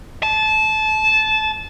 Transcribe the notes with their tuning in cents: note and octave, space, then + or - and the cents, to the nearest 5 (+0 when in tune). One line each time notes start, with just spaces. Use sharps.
A5 -20